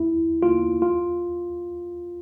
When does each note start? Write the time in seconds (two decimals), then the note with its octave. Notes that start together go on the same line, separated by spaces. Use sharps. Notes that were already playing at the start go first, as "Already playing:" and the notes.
Already playing: E4
0.43 F4
0.82 F4